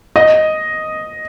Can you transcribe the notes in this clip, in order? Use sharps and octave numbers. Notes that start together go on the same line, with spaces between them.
D#5